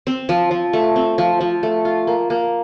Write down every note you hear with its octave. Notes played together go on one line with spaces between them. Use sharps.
C4
F3
F3
A3
C4
F3
F3
A3
F4
A#3
A#3